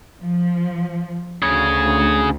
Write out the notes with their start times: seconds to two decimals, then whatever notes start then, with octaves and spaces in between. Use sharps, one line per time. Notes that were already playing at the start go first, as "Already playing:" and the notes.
0.21 F3
1.42 D2 C#3 G#4